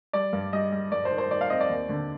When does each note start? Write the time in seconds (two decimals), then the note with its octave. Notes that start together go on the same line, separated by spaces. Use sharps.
0.13 G3 D5
0.33 G2
0.53 G3 D#5
0.72 G3
0.92 G2 D5
1.05 C5
1.11 D#3
1.18 C5
1.31 D#3 D5
1.41 F5
1.50 C4 D#5
1.60 D5
1.69 D#2
1.89 D3